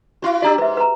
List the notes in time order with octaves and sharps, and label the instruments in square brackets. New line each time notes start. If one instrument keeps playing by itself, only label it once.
[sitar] E4 F#4
[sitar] D4 G4 D5 [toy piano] F#4 A#5 E6
[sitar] G#2 [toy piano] B4 E5
[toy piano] B4 A#5